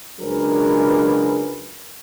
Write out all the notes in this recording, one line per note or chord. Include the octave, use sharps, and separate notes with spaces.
C#2 F#3 D4 G#4 A#4 B4